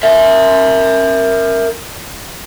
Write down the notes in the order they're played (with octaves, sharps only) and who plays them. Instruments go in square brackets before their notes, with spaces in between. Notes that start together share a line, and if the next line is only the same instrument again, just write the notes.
[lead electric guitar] A#4 E5